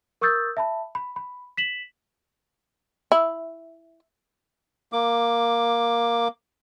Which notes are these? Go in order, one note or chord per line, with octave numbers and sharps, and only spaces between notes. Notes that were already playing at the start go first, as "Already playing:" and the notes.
A#4 C#6 D#6 E6 G6 A6
E5 A5 B5
B5
B5
B6 E7 F#7
E4
A#3 D6